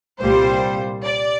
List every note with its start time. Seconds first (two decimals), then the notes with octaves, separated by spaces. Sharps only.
0.20 C2 A#2 G3 C5
1.03 D5